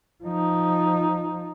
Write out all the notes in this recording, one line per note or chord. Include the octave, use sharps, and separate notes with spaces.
F3 D#4